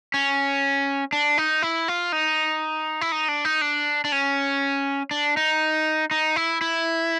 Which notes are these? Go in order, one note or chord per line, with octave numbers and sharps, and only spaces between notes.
C#4
D4
D#4
E4
F4
D#4
E4
D#4
D4
D#4
D4
D4
C#4
D4
D#4
D#4
E4
E4